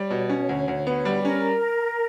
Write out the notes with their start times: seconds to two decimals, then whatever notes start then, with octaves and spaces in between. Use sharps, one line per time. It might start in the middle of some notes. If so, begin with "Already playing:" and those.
Already playing: G3 C#5
0.10 B2
0.30 C#4
0.49 D2
0.68 D2
0.87 B3
1.05 G3
1.19 G4
1.25 C#4 A#4